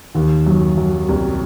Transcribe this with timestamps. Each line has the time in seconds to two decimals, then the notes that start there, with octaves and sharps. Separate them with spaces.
0.14 D#2 D#3
0.46 F#2 F#3
0.77 F#2 F#3
1.08 C2 C3